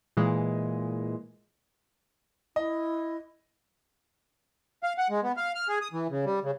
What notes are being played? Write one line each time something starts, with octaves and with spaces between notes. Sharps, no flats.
A#2 E3 G#3
E4 D#5
F5
F#5
G#3
B3
F5
F6
G#4
D#6
E3
C#3
G3
C#3